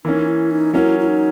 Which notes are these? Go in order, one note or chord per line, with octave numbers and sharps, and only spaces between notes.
E3 A#3 C#4 D#4
E4
D#4
F#3 A#3 C#4 E4
E4
D#4